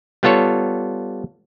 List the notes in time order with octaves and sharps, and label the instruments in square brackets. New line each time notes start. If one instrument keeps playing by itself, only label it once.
[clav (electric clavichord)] G3 B3 F4 A4 C#5